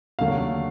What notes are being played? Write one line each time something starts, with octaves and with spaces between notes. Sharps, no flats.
D#2 D3 F#3 A3 F5